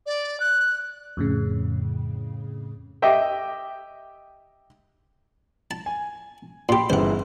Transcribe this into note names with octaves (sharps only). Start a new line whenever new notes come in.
D5
F#6
F2 A2 C#3
G4 D#5 E5 G5
A5
G#5
A#2 G4 B5 C6
G1 C#3 E3 C5 F#5